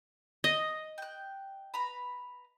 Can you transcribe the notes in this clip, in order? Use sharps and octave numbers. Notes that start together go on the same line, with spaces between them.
D#5
G5 F#6
B4 A#5 B5